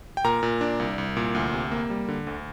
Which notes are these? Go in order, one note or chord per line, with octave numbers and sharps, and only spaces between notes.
G5
A#2 A#4 A#5
A#2
D4
C2
C2
A#2
D2
C3
A#3
G3
D3
D2